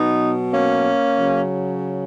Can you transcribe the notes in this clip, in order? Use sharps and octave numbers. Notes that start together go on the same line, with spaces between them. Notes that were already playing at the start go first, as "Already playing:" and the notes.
Already playing: B2 F#3 B3 D#4
A#3 C#4
C#3 F#3